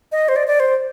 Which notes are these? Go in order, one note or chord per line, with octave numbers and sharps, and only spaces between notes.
D#5
C5
D5
D5
C5